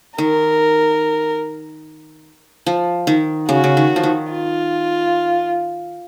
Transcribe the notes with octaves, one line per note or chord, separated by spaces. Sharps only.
D#3 A#4
F3
D#3
C#3 F#4
C#3
D#3
F3
D#3
F4